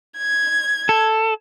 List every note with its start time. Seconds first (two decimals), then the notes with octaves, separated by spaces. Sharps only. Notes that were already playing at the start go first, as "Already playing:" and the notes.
0.18 G#6
0.89 A4